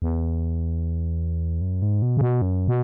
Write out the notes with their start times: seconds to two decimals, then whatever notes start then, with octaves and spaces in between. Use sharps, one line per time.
0.02 E2
1.61 F#2
1.82 G#2
2.02 B2
2.17 C#3
2.21 B2
2.42 F#2
2.68 B2